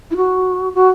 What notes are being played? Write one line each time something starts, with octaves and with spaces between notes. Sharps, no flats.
E4
F#4
F#4